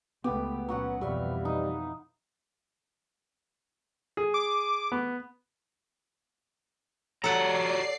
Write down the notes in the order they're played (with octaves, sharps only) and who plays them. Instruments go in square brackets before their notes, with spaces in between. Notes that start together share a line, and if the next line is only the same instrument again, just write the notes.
[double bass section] C#2 A3 [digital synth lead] B3 [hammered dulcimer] G4
[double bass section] A#2 C#4 [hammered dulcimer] F#3 F#4 F#5
[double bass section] F2 B2 E3 [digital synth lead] G3 [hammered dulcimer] B4 E5 F5
[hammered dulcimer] D#4
[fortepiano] G#4
[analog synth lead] D6
[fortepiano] B3
[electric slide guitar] F#4 G4 A#5 [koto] A4 F#5 [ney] C#5 [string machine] D5 C7